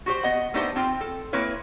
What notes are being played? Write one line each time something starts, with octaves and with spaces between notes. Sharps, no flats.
F#4 G4 C5
B3 D#5 F#5
A3 B3 D4 D#4 G4 C5
C4 F4 G5
A4
A#3 C4 E4 B4 C#5